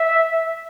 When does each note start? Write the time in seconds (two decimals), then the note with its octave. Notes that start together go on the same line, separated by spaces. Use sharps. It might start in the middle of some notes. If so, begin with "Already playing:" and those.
Already playing: E5